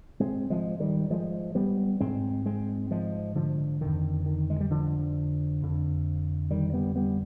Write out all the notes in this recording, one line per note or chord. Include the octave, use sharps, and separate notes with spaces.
G#2 G#3 C4
F3 G#3
D#3 G3
F3 G#3
G3 B3
G#2 G#3 C4
G#3 C4
F3 G#3
D3 F3
F2 D3 D#3
D#3
G#3
G3
D3 F3
F2 D3
D#3 G3
G3 B3
G3 B3